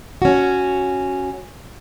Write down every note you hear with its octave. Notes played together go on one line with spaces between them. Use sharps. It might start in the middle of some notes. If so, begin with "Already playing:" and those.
C#4 F#4